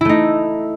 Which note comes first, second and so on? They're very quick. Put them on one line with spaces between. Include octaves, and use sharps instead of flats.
E4 A3 D#4